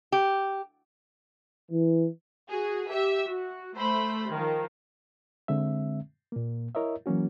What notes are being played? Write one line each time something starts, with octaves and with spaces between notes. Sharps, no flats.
G4
E3
F#4 G#4
G4 E5
F#4
A3 C5 B5
D#3 F3
D3 G#3 C4 E5
A#2 A#3
E4 A#4 C#5 D#5 E5
E3 F#3 A#3 C#4 F#4